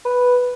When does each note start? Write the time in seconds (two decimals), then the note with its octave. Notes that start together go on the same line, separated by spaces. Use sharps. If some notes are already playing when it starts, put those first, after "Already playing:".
0.05 B4